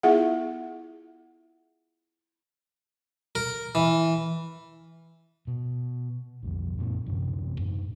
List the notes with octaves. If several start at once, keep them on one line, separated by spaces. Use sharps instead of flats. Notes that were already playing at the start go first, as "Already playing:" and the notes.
B3 E4 F4 G#4 E5 F#5
A#4
E3
B2
B1 F2
F#2 A#2 C4
A1 F#2 C3
F#2 A2